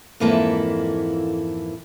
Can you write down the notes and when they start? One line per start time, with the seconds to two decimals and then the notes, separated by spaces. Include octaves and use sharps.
0.20 F2 G#2 E3 A#3 E4 A4